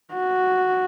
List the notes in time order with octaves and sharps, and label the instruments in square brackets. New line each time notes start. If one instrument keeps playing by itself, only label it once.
[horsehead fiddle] F#4